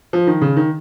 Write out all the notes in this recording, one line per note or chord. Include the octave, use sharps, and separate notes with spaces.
F3
D#3
C#3
D#3